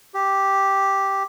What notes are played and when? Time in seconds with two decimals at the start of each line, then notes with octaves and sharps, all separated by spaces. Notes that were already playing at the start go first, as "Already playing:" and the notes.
0.14 G4